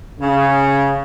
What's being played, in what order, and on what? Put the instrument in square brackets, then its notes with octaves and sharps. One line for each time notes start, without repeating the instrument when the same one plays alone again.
[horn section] C#3